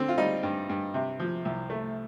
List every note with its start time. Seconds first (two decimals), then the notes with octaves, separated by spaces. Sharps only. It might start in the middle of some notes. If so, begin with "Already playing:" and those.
Already playing: D3 C4
0.08 F4
0.18 G3 D#4
0.43 G2
0.69 G2
0.94 C3
1.20 F3
1.45 C2
1.70 A3